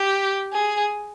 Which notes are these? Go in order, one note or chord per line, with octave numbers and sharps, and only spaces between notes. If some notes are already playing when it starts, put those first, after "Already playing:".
Already playing: G4
G#4